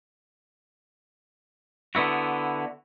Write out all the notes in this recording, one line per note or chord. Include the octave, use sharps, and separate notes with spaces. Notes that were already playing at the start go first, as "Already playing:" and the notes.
D3 B3 E4 F#4